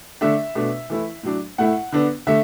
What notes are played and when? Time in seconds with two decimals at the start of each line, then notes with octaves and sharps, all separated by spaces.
0.21 D3 A3 D4 E5
0.55 B2 A3 D4
0.90 E3 A3 E4
1.23 A2 F#3 D4
1.58 A2 A3 E4 F#5
1.92 D3 B3 D4
2.27 D3 A3 E5